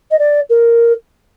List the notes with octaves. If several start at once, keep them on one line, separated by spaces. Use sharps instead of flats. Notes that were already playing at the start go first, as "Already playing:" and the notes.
D#5
D5
A#4